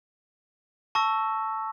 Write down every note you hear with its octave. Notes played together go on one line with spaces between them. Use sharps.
A5 C#6 E6 A#6